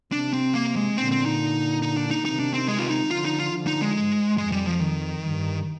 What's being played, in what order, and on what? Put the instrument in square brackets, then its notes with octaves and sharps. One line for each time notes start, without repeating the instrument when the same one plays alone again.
[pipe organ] C3 [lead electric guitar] D4
[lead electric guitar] C4
A#3
G#3
[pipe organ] A#2 D3 [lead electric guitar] C4
[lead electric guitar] C4
D#4
D#4
D4
D#4
[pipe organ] C3 D#3 [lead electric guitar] D#4
[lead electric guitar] D4
C4
G#3
F4
D#4
[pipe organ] D3 F3 [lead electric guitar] F4
[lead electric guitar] D#4
F4
[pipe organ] D3 F3
[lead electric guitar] D#4
G#3
[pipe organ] G#2
[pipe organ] F2 [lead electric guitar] G#3
[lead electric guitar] G3
F3
D#3
[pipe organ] G2